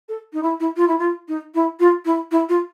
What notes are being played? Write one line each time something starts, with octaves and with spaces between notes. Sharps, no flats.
A4
D#4
E4
E4
F4
E4
F4
D#4
E4
F4
E4
E4
F4